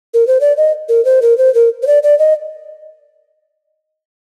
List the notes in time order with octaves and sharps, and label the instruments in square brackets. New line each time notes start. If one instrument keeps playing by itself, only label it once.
[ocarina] A#4
C5
D5
D#5
A#4
C5
A#4
C5
A#4
C5
D5
D5
D#5